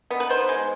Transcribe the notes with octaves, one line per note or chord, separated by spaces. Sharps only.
B3
B4
D#3 C5
G#3